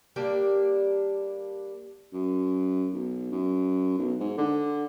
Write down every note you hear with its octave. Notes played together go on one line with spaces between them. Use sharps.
G3 A#3 D4 G4
F#2
B1
F#2
B1
G#2
D3